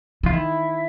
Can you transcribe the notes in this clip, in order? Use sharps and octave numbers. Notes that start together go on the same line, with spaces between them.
E3 F4
D#3 E4